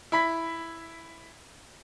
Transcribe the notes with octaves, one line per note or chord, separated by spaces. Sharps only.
E4 B5 B6